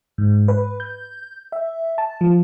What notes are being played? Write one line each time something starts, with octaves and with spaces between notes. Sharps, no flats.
G#2
B4
G6
E5
A5
F3